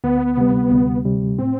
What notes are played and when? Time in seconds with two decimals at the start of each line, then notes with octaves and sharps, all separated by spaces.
0.04 D2 B3
0.37 C3 G3
0.71 D2
1.05 C3 G3
1.39 A2 C4